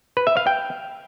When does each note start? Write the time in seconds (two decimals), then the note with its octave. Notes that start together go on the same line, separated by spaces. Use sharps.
0.17 B4
0.27 E5
0.37 F5
0.47 G5